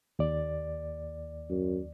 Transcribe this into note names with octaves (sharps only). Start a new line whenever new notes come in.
D#2 D5
F#2